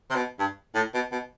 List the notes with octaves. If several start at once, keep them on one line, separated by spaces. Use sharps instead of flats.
C3
B2
G2
A2
B2
B2